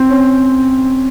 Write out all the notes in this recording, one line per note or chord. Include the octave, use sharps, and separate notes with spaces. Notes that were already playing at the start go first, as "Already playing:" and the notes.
Already playing: C4
C#4